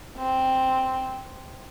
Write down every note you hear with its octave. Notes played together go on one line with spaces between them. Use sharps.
C4